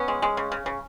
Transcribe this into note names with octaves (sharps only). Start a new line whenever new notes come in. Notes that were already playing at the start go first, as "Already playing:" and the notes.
Already playing: B3 C#4
G#3
G#3
C#3
C#3
C#3